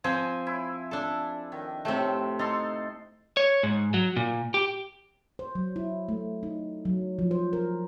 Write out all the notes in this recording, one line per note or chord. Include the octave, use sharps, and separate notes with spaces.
F3 C4 C5 G#5
E4
D4 A4
D#3
A2 C3 A3 C4
D#4 A4 C6
C#5
G#2
F#3
A#2
G4
C5
F#3
E4
A3
D#4
F#3
F3
C5
A#4